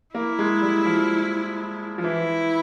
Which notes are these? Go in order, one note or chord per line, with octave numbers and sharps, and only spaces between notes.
A#3 E4
G#3
G3
F3
F3
E3 E4